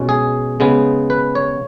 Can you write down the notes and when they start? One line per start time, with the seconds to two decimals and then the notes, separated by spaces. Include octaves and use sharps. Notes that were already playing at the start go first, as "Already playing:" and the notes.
Already playing: B2 G#3 C#4
0.09 G#4
0.60 C#3 G#3 B3
1.10 B4
1.35 C#5